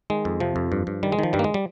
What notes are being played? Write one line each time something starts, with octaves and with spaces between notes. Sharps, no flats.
D#3 G#3
F2
C3 F3
F2
G2
G2
D#3 G3
G#3
D#3 F3
G2 G3
A#3
G#3
G3